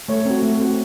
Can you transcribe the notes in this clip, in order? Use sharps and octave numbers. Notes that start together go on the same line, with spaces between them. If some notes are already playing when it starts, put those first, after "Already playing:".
A3 C#5
C4 F#4
A3
C4 F#4